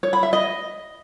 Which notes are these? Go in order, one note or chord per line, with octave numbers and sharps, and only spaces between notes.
C#5
B5
E5
D#5